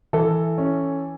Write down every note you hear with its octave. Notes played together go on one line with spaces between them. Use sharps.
E3 A4
C#4